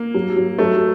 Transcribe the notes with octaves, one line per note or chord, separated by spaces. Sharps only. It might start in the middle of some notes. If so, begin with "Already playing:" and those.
Already playing: A#3
F#3
F#3
F#3 A3